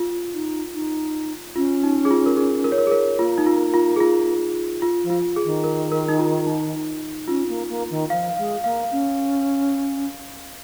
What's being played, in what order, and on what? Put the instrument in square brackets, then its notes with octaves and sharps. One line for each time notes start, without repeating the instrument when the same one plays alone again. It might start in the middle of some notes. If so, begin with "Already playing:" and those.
Already playing: [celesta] F4
[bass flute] D#4
D#4
[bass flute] C#4 [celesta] F4
[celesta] D#4
G#4
F4
A#4
G#4
A#4
C#5
A#4
G#4
A#4
[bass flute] A#3 [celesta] F4
[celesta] D#4
F4
F4
G#4
F4
F4
[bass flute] F3
[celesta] F4
G#4
[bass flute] D#3
[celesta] A#4
A#4
D#4
F4
D#4
[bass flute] C#4 [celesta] F4
[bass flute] A#3
A#3
D#3
[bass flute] F3 [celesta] F5
[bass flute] G#3 [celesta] F5
[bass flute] A#3 [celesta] F5
[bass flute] C#4